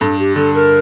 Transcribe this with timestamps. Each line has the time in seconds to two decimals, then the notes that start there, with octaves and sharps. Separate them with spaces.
0.01 G2 A4
0.19 G4
0.36 D3 A4
0.54 A#4